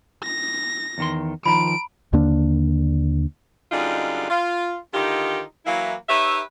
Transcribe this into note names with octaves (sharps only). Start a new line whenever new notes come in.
A#6
E2 D#3 C6
D#3 F3 A#5 B5 D7
D#2 D3 A#3 D4
F#2 D3 G3 G#3 D#4 F4
F4
D3 D#3 D#4 F4 G4
E3 F#3 A#3 E4
D#4 G4 B4 C#5 E5